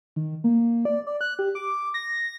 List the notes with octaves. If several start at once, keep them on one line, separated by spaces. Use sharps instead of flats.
D#3
A#3
D5
D5
F#6
G4
D6
A#6